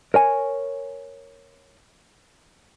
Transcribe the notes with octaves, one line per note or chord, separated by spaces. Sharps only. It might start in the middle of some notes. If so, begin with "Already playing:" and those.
A#4 C#5 G#5